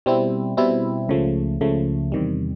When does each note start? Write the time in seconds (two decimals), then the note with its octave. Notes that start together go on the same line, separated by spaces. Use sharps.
0.06 B2 G3 C4 E4
0.57 B2 G3 C4 E4
1.09 C#2 C#3 F3 A3
1.61 C#2 C#3 F3 A3
2.12 E2 C3 D#3 G3